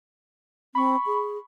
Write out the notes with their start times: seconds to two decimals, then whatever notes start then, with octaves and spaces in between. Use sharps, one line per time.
0.75 C4 B5 C#6
1.06 G#4